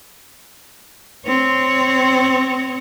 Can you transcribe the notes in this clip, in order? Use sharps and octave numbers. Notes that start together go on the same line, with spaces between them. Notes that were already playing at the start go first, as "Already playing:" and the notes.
C4 C#5